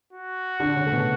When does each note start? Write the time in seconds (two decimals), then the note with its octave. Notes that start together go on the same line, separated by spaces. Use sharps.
0.13 F#4
0.60 D3 D4
0.76 C#3 C#4
0.86 A3
0.92 B2 B3